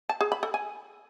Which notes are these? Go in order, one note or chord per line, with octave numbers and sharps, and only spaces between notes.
A5
G#4
B5
A4
G#5